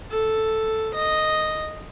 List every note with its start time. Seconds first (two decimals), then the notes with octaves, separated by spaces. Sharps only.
0.11 A4
0.94 D#5